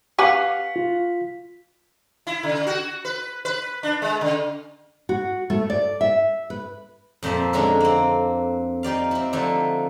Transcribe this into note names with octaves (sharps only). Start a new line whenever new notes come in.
G4 B4 F5 F#5 G#5 C#6 B6
F4
E4
C#3
F#4
B4
B4
D4
G#3
C#3
F#4
A3
D5
E5
B4
F2 A#2 C5 E5 A5
D3 G#3 C#4 D4 A4 A#4
A#3 C4
D#4 G4 D5 F5
C4 E4
D3 F3 A3 D4 D#4